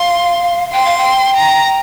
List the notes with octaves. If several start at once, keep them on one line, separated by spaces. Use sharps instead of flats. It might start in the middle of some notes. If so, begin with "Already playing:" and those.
Already playing: F5 C6
G5 C6
F5
G5
A#5